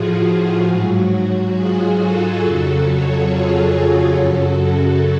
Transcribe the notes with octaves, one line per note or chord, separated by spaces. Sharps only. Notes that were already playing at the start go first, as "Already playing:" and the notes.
Already playing: A2 F3 F4 F#4 G#4
F#4
G#2 F#3
F#4
F4 G#4
F#4 A4
F2 C#3 F#3
A4 C#5
F4 G#4
F#4 A4
F#2 C#3 F#3
F#4